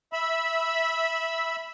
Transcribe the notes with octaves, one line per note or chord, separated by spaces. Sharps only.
E5 B5 E6